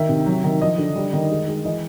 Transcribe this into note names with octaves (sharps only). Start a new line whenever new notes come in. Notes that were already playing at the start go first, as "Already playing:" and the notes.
Already playing: D#3 E5
C3
F#3
D#3
F3 D#5
D3
G3
D#3
G#3
G#3
E3 D#5